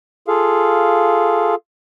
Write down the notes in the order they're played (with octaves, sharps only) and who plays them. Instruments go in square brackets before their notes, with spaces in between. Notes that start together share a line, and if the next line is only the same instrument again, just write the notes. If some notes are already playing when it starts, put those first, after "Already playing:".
[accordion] F4 G#4 A4 F5